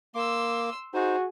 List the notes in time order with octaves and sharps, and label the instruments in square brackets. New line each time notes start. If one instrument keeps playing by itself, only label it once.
[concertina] A#3 D6 [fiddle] C6 E6
[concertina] D#4 C5 [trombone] F#4 [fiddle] G#4